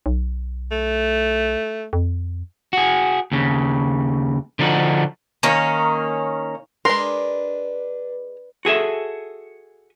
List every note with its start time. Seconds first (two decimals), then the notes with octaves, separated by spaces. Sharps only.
0.06 B1
0.71 A3
1.93 F2
2.73 F#4 G#4
3.32 D#2 C#3
4.59 D3 F3 D4 D#4 F#4
5.43 D#3 A#3 C#4 A#4
6.85 G#3 D4 A#4 B4 C6
8.65 F#4 G#4 A4 E5